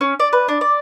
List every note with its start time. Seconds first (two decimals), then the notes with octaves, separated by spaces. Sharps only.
0.01 C#4
0.20 D5
0.33 B4
0.48 D4
0.61 D5